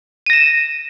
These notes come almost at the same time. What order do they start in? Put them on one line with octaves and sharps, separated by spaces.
D#7 A#6 E7